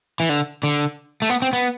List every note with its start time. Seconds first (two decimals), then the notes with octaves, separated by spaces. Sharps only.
0.20 E3
0.29 D3
0.63 D3
1.22 A3
1.30 B3
1.42 C4
1.53 B3